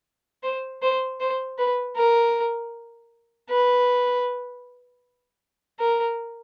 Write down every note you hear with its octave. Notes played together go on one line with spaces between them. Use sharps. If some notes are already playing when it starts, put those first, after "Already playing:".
C5
C5
C5
B4
A#4
B4
A#4